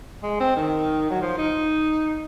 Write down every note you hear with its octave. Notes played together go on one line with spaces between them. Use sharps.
G#3
C4
D#3
F#3
F3
D#4